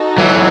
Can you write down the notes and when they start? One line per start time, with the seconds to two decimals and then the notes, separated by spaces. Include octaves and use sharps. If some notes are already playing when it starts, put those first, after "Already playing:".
Already playing: D#4 F#4 A4
0.18 E3 F#3